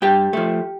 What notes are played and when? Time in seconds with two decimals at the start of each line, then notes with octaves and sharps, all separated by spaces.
0.02 G2 G4 G5
0.33 F3 A3